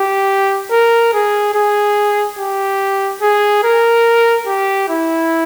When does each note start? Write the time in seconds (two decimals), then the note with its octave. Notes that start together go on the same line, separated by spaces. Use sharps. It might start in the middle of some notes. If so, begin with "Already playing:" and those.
Already playing: G4
0.71 A#4
1.13 G#4
1.54 G#4
2.39 G4
3.22 G#4
3.64 A#4
4.46 G4
4.88 E4